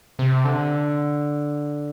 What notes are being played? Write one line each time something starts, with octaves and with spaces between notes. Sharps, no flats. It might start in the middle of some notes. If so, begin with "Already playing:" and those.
C3
D3